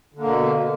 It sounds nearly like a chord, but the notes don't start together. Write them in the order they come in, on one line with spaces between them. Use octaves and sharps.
D3 A#3 B2